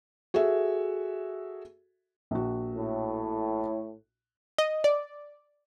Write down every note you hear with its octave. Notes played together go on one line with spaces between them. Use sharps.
F#4 G#4 A4 E5
A#1 F#4
A2
D#5
D5